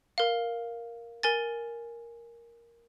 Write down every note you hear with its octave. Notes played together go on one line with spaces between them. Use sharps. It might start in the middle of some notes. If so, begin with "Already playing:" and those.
A#4 F5
A#4 G#5 A6